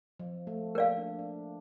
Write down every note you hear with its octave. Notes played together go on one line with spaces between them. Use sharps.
F3
A3
A#3 A#4 D5 F5
D4
D4